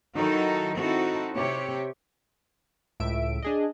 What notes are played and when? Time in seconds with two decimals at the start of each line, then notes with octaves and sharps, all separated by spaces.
0.16 D#3 F#3 D#4 E4 F#4 A4
0.78 C4 D#4 E4 F#4 A4
1.36 C3 G4 C#5
3.00 C#2 A2 E5 D7
3.42 D4 G#4 D#5